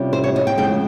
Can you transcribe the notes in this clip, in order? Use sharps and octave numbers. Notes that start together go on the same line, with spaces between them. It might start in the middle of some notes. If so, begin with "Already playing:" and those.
Already playing: C3 G3 C#4 F4
C5
C#5
D#5
G5
F2 C#3 G#3 G5